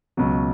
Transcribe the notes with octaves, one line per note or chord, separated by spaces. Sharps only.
C#2 B2 F#3